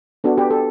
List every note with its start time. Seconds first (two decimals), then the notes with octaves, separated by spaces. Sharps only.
0.24 B3 D4 F#4 A4
0.38 G4 B4
0.51 A4